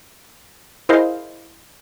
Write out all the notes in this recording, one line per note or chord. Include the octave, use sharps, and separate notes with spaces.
E4 G#4 A#4 C5 D#5 F5